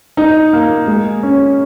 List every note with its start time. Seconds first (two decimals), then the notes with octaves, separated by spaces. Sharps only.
0.17 D#4
0.53 A#3
0.87 G#3
1.23 C#4